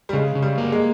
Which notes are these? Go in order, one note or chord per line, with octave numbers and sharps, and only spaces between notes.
G3
C#3 G#3
C#3
G3
A#3
G#3